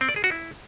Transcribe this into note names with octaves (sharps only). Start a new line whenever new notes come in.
C4
D5
G#4
F#4
E4